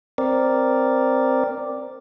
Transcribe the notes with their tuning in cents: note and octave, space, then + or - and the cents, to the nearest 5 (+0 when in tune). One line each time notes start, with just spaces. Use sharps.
C4 +0 A#4 +0 D5 +0